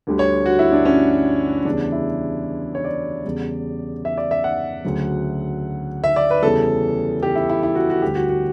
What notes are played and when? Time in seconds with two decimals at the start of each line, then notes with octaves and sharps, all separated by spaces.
0.07 D2 D3 G3
0.19 C#5
0.46 F#4
0.59 E4
0.72 D4
0.85 C#4
1.65 E2 C#3 E3 G3 D4
1.92 E4
2.75 C#5
2.84 D5
3.25 E2 C#3 G3
4.05 E5
4.18 D5
4.31 E5
4.44 F#5
4.84 D2 C#3 F#3
6.04 E5
6.16 D5
6.30 B4
6.43 E2 C#3 E3 G3 A4
7.23 G4
7.35 E4
7.50 E4
7.63 E4
7.75 F#4
7.90 F#4
8.02 D2 D3 G3 G4
8.15 F#4
8.29 F#4